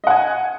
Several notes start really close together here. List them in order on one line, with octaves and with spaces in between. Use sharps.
D#5 F#5 G#5